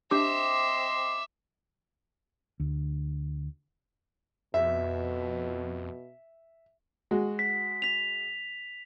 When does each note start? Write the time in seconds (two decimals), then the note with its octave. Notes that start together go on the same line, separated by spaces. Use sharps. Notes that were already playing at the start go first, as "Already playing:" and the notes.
0.11 C4 D4 G4 D#5 E5 C6 D6
2.60 D2
4.54 F2 B2 E5
7.11 G#3 F#4
7.39 B6
7.82 B6 F7